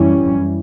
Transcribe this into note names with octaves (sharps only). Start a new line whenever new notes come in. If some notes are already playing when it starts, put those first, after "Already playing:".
Already playing: F#2 E3 G3 C#4 E4